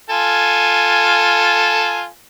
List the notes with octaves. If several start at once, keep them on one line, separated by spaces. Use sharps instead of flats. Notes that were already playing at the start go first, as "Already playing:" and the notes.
F4 A4 G#5